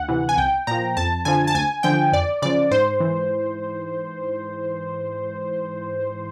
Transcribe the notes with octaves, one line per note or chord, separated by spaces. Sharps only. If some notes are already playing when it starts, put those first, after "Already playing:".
Already playing: D2 F#5
C3 E3
G#5
C2 G5
A#2 F3 A#5
F2 A5
D3 F3 G#5
A5
D2 G#5
D3 F3 G5
F2 D5
C#3 F3 D5
G#2 C5
E3